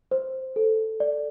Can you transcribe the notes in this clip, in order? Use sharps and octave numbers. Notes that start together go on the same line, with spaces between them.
C5
A4
D5